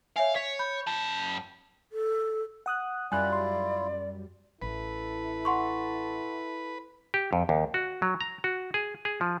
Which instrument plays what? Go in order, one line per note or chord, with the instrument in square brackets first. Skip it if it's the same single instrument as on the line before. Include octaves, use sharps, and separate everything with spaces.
[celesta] C#5 E5 G#5 [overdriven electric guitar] F5
[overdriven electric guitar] C#5 [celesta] B6
[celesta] B5 G6
[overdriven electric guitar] F#2 A5
[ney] A4
[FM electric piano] F#5 D#6 F#6
[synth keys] F#2 G3 [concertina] E4 F4 [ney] D5 [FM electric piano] G#5 F#6
[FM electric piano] C6
[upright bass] A1 [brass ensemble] E4 A4 [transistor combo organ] B4
[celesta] F#5 C6 C#6
[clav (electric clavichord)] G4
F2
D#2
F#4
F#3
A#5
F#4
G#4
G#4
F3